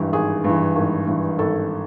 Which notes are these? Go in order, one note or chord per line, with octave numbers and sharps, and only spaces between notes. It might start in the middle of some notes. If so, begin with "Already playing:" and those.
Already playing: G#1 G2 E3 G4
G#1 G#4
G2 E3
G#1
G2 E3
G#1 A4